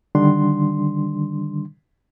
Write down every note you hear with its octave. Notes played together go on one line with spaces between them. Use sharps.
D3 D#3 G3 D4 C6